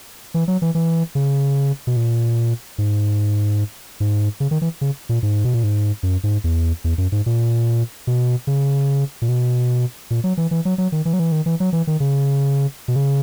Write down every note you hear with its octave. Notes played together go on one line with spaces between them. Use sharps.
E3
F#3
E3
E3
C#3
B2
A#2
G#2
G#2
C#3
D#3
E3
C#3
A#2
G#2
B2
A#2
G#2
F#2
G#2
E2
E2
F#2
G#2
A#2
B2
C#3
A#2
B2
A#2
F#3
E3
E3
F#3
F#3
D#3
E3
F#3
E3
D#3
E3
F#3
E3
D#3
C#3
B2
C#3